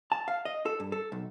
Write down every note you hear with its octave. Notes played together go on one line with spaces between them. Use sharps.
A5
F5
D#5
A4
G2
A4
B1